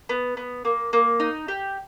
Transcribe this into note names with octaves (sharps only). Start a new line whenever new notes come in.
B3
B3
A#3
A#3
D#4
G4